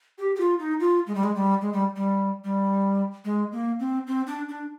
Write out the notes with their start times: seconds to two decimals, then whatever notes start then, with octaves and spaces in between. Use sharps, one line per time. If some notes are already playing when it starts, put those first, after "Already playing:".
0.18 G4
0.35 G4
0.40 F4
0.59 D#4
0.80 F4
1.07 G#3
1.15 G3
1.23 G#3
1.35 G3
1.61 G#3
1.73 G3
1.96 G3
2.44 G3
3.25 G#3
3.52 A#3
3.80 C4
4.07 C4
4.27 D4
4.48 D4